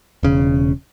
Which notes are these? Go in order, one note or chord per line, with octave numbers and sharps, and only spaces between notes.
E1 C#3